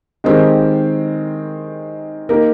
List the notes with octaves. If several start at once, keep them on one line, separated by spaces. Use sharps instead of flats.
D#3 G#3 C4 G4 A#4
A#3 D#4 G4 A#4